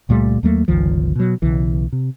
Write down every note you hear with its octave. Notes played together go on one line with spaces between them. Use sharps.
C#2 A#2 G3 A3
D#2 F#3 A3 A#3
G1 C#2 D#3 F3
B2 F#3
B1 C#3 E3
C3